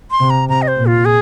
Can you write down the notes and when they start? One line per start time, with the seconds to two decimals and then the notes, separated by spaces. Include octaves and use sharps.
0.11 C6
0.20 C3
0.30 A#5
0.49 C3 A#5
0.62 D#5
0.68 C5
0.77 A#2
0.86 F4
1.05 G#4